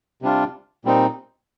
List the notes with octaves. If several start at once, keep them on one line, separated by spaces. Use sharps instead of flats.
C3 G3 D4 F4
A#2 G3 C4 D#4